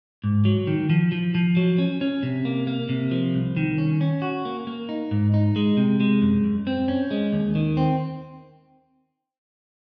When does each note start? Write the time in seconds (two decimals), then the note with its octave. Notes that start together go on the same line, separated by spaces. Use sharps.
0.24 G#2
0.45 F#3
0.67 D#3
0.90 F3
1.12 F3
1.35 F3
1.57 F#3
1.78 C#4
2.01 C#4
2.23 C3
2.45 A#3
2.67 A#3
2.89 C3
3.11 F3
3.34 C2
3.57 D#3
3.78 C#4
4.01 C#4
4.22 F#4
4.45 A#3
4.67 A#3
4.89 D#4
5.11 G#2
5.34 D#4
5.56 G#3
5.77 C3
6.00 G#3
6.22 F#2
6.44 F#2
6.67 C4
6.88 C#4
7.11 G#3
7.33 D#2
7.55 D#3
7.77 C4